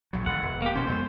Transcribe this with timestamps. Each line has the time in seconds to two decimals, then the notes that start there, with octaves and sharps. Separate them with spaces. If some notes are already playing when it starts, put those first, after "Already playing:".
0.13 A#1 F#3
0.26 G#1 F2 F#5
0.43 E1
0.62 A#3 G4
0.75 E1 B2 C#4 C5
0.89 F2 G#3 B3